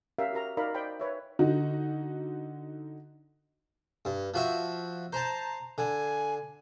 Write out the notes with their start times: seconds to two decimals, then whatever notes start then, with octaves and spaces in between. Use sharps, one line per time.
0.18 C#4 G4 A#4 E5 F5
0.33 F#4 G4 A#4 A#5
0.57 D#4 F#4 A#4 D5 F5 B5
0.74 C5 D5 D#5 G5 B5
1.00 B4 C#5 E5
1.39 D3 D#4 F#4
4.05 G2
4.34 F3 F#4 E5
5.13 C5 A5 A#5
5.78 D3 G#5